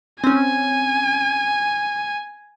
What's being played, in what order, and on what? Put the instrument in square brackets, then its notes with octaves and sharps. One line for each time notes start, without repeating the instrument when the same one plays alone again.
[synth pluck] C4 C#4 [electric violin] G#5